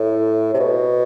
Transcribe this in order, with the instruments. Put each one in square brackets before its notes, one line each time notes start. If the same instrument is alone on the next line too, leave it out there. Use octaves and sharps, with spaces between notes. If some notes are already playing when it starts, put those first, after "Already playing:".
Already playing: [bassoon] A2
C3
B2